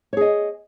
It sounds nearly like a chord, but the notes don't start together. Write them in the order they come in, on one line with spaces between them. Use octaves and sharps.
C#5 G#4 D#5